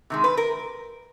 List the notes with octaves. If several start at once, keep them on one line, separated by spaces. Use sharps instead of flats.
C3 D#3 G#3
B4
A#4